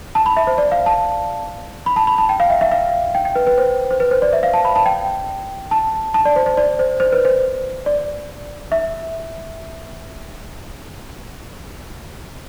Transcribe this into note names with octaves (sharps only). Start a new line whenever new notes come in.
A5
B5
E5
C5
D5
F5
A5
B5
A5
B5
A5
G5
F5
E5
E5
F5
G5
G5
B4
B4
C5
C5
B4
C5
D5
E5
F5
A5
B5
A5
G5
A5
A5
D5
C5
C5
D5
C5
C5
B4
C5
D5
E5